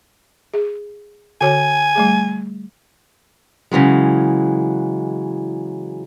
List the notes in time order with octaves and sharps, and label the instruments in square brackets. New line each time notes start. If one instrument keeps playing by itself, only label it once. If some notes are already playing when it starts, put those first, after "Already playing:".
[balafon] G#4
[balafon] D3 F#4 C#5 [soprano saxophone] G#5
[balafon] G3 A3 G#4
[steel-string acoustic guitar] C#3 E3 F#3 G#3